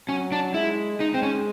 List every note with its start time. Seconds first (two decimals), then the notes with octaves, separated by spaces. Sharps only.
0.08 F#3 C#4
0.32 D4
0.54 G#3 E4
0.99 G#3 D#4
1.14 C4
1.23 C#4